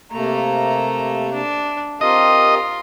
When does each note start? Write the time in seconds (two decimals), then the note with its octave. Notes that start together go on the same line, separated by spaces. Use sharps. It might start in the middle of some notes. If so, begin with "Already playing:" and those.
0.12 C3 A3 A#3 A#5
1.33 D4
2.01 C4 F4 G4 A#4 D#5